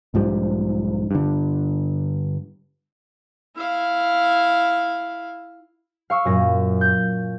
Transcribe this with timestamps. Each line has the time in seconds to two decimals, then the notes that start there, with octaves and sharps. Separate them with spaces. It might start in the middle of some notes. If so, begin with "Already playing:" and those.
0.14 B1 G#2 F3 G3
1.11 G2 D3
3.56 E4 F5
6.10 F5 C#6 E6
6.25 F#2 A#2 A#6
6.81 G6